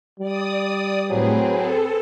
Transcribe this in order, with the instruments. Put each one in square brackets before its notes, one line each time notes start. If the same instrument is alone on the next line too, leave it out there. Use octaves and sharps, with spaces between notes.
[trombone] G3 [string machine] D5 D#6
[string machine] A2 [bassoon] F#3 [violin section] C4 G#4 B4
[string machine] A4